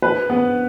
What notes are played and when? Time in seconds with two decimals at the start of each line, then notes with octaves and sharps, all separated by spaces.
0.02 B4
0.30 B3